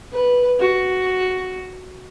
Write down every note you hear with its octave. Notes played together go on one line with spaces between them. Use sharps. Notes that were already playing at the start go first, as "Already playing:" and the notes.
B4
F#4